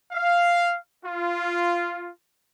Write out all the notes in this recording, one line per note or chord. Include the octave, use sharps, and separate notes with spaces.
F5
F4